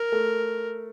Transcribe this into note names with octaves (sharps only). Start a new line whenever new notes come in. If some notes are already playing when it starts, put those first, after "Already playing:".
Already playing: A#4
A3 A4